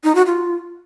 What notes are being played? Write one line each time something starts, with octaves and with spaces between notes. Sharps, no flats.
D#4
F#4
F4